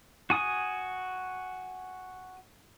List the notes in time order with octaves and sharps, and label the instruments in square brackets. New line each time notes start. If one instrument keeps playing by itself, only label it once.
[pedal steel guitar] F#4 G#5 D#6